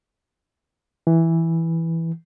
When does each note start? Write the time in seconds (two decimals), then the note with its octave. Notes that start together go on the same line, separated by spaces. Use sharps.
1.07 E3